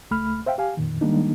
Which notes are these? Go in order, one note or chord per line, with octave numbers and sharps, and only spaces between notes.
C#2 A3 B5 F6
C5 E5 F5 G5
G4 F5 G#5
F2 A#2 D#3
D#3 G3 G#3 A#3 D4 D#4